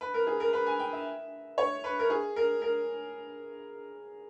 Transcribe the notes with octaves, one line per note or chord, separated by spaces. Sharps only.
B4
A#4
G#4
A#4
B4
G#5
G5
E5
C#5
B4
A#4
G#4
A#4
A#4